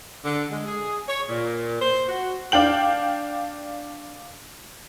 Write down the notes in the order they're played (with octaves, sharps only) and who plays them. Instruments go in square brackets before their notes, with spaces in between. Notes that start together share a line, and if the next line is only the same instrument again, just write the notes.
[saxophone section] D3
G#3
G#4
C#5
A#2
C5
F#4
[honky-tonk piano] D4 F5 G5 F#7